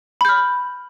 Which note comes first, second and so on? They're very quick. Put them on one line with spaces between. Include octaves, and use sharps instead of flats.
B5 G6 F6